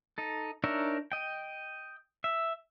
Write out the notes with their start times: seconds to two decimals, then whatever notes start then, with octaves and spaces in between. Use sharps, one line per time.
0.18 D#4 A4
0.64 D4 D#4 A#4 C#5 E5
1.12 D#5 G5
2.24 E5